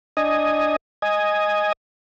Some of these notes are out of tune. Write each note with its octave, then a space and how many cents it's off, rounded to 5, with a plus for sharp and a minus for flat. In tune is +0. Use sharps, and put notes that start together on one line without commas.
D4 +0 D#5 +0 G#5 +0
D#5 +0 G#5 +0